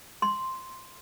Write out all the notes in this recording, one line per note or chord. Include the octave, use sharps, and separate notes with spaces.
C6